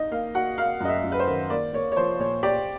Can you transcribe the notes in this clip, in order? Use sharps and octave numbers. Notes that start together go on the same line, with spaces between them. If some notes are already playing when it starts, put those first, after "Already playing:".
Already playing: D#4 D#5
A#3 F5
F#4 F#5
A#3 F5
F#2 D#5
E5
F#2
B4
C5
D#3
A#3 D5
A#3 C#5
C#5
F3 C5
A#2 C#5
G4 D5